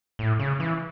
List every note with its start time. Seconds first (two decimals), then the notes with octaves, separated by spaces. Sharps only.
0.19 A2
0.39 C#3
0.60 E3